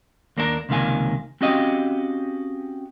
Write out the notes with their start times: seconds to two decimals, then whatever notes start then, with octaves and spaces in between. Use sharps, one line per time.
0.37 D#2 A#3 D4 E4 A#4
0.69 C#2 C3 D#3 A#3 F5 G#5
1.41 C4 C#4 F#4 G4 D#5 F5